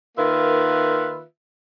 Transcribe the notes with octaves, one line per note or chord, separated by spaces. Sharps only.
D#3 A#3 F4 B4 E5